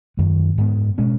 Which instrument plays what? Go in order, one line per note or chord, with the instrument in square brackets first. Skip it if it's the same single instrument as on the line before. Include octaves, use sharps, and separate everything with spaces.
[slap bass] F#2 D#3 G#3
G#2 G#3 B3
B2 G#3 C#4